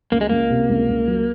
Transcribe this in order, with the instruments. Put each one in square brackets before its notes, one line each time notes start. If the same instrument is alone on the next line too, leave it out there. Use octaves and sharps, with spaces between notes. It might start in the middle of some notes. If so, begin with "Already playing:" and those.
[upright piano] C#2 [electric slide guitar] A#3
[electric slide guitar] G#3
[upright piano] C#2 [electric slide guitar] A#3
[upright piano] C3
C#2
C#2
F#3